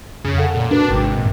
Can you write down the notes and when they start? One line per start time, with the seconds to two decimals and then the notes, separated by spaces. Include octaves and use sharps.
0.25 F2 C#3
0.37 G#4 A4 F#5
0.55 A#2
0.71 D4 F#4 A#4 B4
0.90 G#1 C3 G5 D6
1.18 A1 G2 A#2